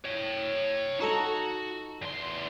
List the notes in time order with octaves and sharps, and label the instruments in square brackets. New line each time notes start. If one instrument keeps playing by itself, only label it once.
[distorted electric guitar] C#5 G5
[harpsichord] D#4 A4 A#5 [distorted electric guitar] F#4
[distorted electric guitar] E2 C6